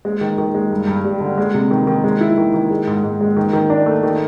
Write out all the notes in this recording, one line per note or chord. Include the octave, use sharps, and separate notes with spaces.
G#3
D#3
D#3
G#3
G2
G2
G3
D3
G#3
C3
D#3
D#3
G#3
E4
D#3
D#3
G#3
G#2
G#2
G#3
D#3
D#3
D4
A3
D#3